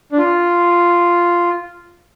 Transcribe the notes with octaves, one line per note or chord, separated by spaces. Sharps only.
D4
F4